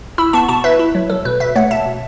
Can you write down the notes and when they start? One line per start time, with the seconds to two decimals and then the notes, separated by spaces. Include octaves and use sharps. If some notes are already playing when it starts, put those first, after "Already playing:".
0.18 E4 B5 E6
0.33 B3 A5 C#6
0.49 B2 A5 C#6
0.64 E4 B4 E5
0.79 E4
0.95 F#3
1.10 F#3 A4
1.25 B2 B4
1.40 B2 B4 E5
1.56 A3 C#5 F#5
1.71 B2 E5 A5
1.86 B2